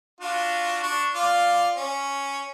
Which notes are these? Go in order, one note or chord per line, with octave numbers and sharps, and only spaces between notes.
D4 F4 F#4
D4 C#6
F4 D5 F5
C#4